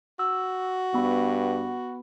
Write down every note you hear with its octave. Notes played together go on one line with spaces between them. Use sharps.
F#4 E6
G2 B3 B5